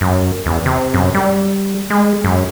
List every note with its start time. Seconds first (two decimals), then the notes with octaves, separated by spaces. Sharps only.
0.01 F#2
0.46 E2
0.66 C3
0.94 F#2
1.14 G3
1.90 G#3
2.24 F#2